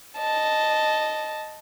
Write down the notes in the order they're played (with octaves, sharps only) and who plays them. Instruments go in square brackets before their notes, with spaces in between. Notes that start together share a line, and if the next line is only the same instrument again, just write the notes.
[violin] D#5 A5